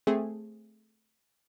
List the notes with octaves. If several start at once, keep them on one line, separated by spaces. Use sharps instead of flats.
A3 C4 G#4